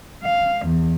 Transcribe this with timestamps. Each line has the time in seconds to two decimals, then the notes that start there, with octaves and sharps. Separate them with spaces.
0.23 F5
0.65 E2